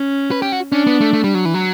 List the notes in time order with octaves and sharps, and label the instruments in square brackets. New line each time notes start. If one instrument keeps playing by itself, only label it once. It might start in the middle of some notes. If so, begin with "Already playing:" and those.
Already playing: [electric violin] C#4
[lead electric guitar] B4
G4
F#4
[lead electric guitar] C#4 [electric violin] D4
[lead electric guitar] B3
A3
A3
G3
F#3
E3
F#3